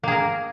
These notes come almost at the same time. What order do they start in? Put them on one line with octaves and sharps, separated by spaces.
A#3 G#4 A#4